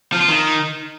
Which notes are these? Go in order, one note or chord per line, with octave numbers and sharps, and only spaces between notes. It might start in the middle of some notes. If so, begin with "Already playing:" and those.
F3
F4
D#3